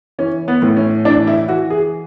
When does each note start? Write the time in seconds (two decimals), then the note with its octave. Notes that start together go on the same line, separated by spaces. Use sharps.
0.19 E3 C#4
0.48 B3
0.62 A2
0.77 C#4
1.05 E3 D4
1.27 E4
1.49 E3 F#4
1.70 G#4